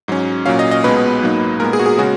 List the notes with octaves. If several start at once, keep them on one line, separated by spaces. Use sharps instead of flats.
G#2 F#3 C#4
A#2 F#3 C#4 F5
D#5
D#5
B1 B2 G#3 B3 B4
G#2 F#3 A#3 D#4
A#2 G#3 B3 A#4
G#4
F#4
G#4
C#3 G#3 C#4 F#4